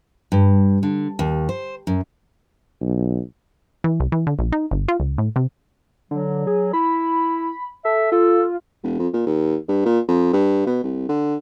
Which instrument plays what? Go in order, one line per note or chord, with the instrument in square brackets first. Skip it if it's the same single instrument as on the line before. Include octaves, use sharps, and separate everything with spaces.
[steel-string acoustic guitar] G2
D3
D#2
C5
F#2
[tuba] B1
[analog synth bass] E3
C2
E3
D3
A#1
D#4
G1
F4
C#2
A2
C3
[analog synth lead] D3 [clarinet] F#3
[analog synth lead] G#4
[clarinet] E4 [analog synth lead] B5
[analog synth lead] A4 [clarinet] E5
[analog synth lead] F4 [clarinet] A4
[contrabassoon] E1
F2
A#2
D#2
G2
A#2
F2
G2
B2
C2
D3